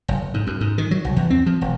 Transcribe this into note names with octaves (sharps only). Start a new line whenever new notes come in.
F#1
G#2
F#2
G#2
D#3
F#3
C2
E2
C4
F3
E1